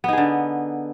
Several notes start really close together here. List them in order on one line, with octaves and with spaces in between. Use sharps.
B3 D#4 G#4 D3